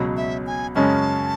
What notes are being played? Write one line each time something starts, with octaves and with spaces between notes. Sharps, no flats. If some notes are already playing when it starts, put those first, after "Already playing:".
Already playing: C#2 B2 F#3
E5
G#5
F#2 C#3 G#3 C#4 A5